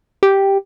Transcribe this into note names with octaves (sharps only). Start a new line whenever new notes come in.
G4